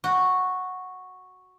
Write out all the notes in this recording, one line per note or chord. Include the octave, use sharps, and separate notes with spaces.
F#4